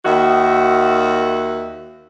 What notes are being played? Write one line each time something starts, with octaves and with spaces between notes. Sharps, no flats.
D#2 D#3 F#4 E5